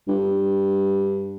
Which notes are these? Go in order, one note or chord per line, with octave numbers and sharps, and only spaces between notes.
G2